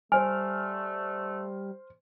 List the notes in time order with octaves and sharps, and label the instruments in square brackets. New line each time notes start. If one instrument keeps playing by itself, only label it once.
[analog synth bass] G3 [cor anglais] A3 [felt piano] C5 F6 [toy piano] G#5